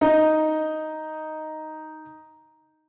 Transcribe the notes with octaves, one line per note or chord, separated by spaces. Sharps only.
D#4 D#5